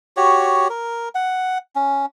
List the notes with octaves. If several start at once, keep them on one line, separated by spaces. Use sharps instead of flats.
F#4 G4 C#5
A#4
F#5
C#4